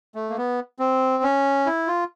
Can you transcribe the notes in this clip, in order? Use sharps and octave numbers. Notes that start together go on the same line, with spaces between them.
A3
A#3
B3
C4
C#4
E4
F4